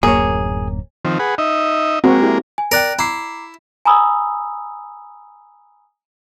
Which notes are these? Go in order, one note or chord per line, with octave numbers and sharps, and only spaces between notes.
D1 F#2 A#3 G#4 C#5
D#3 F3 C4
G#4 B4 F#5
D#4 D#5 E5
G#3 A#3 C4 F#4 A#4
E4 G4
G#5
A#4 D5 G5 F#6 D7
E4 A#5 D6 C7
G#5 A#5 B5 D#6 E6